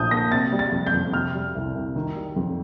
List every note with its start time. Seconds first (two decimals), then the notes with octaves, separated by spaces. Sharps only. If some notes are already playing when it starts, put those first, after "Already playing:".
Already playing: A#1 A2 F3 A5 D#6 G6
0.11 A#3 A#6
0.32 C3 A6
0.52 G3
0.59 A6
0.72 F2
0.86 G6
0.93 F2
1.14 C3 F6
1.34 G3
1.55 C2
1.75 C2
1.96 D#3
2.16 G3
2.36 F2